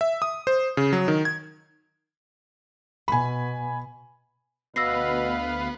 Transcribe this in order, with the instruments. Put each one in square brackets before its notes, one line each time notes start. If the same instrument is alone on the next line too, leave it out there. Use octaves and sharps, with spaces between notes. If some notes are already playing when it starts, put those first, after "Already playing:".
[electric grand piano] E5
D#6
C5
C#3
F#3
D#3
G#6
[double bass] B2 [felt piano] G#5 B5
[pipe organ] D2 B4 F5 [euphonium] B2 [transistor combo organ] B3 [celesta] E6 A#6 C7